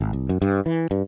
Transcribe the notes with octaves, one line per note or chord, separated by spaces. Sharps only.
G#1
C2
F#2
G2
E3
G2